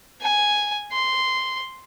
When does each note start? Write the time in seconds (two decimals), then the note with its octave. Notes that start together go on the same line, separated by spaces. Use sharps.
0.22 G#5
0.93 C6